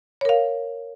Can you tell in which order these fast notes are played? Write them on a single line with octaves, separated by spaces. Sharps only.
C#5 A#4 F5